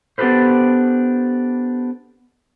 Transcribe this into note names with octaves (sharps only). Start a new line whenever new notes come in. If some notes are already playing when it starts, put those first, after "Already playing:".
B3 D4 G4 A4 B4 C5